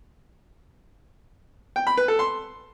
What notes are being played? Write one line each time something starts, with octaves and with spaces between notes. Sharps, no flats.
G5
B5
B4
A4
C6